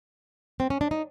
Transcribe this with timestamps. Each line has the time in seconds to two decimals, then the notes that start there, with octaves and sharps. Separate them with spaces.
0.60 C4
0.70 C#4
0.81 D4
0.91 D#4